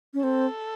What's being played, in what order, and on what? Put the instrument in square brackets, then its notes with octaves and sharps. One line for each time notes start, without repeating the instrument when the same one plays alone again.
[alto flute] C#4
[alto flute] C4 [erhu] A4